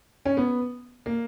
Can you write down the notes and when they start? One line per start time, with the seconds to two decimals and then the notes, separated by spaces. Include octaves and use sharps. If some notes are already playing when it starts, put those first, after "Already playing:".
0.25 C#4
0.37 B3
1.06 A#3